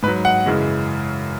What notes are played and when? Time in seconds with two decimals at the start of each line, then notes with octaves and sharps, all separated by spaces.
0.03 G#2 B4
0.08 F#3
0.25 F#5
0.46 F#2 C#3 E3 G#3